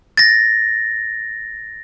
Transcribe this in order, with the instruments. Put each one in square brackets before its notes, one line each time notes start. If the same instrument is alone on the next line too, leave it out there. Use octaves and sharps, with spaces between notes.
[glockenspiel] A6 A#6